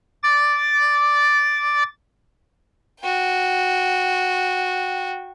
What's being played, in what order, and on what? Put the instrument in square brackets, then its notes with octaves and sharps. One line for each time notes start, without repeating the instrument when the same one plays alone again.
[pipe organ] D6 A6
[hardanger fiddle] F#4 G5